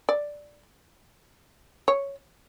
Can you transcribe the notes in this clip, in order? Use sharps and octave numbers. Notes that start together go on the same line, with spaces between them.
D5
C#5